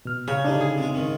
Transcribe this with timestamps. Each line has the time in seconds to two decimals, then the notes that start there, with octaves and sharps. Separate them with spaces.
0.05 B2 F6
0.28 C#3 C#5
0.45 D3 G3 D4 D#4
0.61 G#4
0.78 C3 G#3
0.93 G#2 D#3